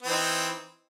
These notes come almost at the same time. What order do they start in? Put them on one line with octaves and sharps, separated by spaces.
C4 E3 D#4